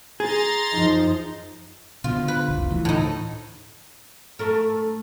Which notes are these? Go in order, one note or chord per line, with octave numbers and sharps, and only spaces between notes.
G#4 A#5 C6 A6
F#2 F3 D#4
B2 D3 F4
B4
F1 C2
D2 E3
A2 D#4
A3 A4 A#4